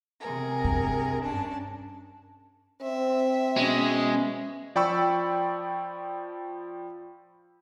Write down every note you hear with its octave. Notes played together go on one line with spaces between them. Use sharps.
C3 G#4 A#4
G2
C#4 D4 A5
C4 E5
B2 G#3 C#4
F3 D5 G5 B5 C#6 E6